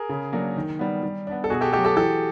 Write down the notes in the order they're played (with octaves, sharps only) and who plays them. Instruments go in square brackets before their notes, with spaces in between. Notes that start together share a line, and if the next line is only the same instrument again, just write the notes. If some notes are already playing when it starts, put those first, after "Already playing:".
Already playing: [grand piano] G#4 A#4
[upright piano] C#3
F#3 A#3 D4
D#3
G3 B3
G3
B3 D4
[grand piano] A4
[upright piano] B2 [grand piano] F#4 G#4
[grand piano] G4 A4
[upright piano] A3 [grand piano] G4 A4
[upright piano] F#3
[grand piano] G4 A4
[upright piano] E3 [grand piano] G4 A4